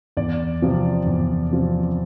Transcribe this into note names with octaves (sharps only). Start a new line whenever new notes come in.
E2 D5
C3 F3 C4
E2
C3 F3 C4